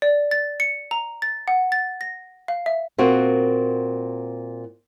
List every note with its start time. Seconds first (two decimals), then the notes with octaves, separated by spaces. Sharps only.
0.02 D5
0.31 A6
0.60 C#7
0.91 A#5
1.22 A6
1.48 F#5
1.72 A6
2.01 A#6
2.48 F5
2.66 E5
2.98 A#2 A#3 C4 F#4